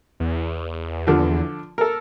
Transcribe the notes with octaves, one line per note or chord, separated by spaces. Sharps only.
E2
D3 F3
A4 A#4